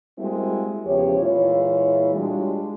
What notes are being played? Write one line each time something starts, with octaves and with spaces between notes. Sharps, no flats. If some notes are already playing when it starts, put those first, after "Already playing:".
G3 G#3 A#3 C4 E4 F#4
E2 C#3 F3 G4 C#5
A#2 E3 G#3 E4 F4 C#5
G3 G#3 D4 F4 F#4